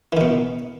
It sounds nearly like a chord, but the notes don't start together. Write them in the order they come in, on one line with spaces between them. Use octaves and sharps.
E3 D#3 B2